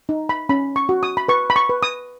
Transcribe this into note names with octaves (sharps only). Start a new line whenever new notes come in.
D#4
B5
C#4 B5
C#6
F#4
D#6
B5
B4 C#6
B5
C#6
B4
D#6